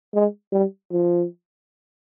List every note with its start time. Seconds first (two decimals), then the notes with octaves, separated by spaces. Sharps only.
0.14 G#3
0.52 G3
0.91 F3